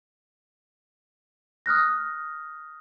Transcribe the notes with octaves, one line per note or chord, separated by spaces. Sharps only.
D#6 F6 F#6 A#6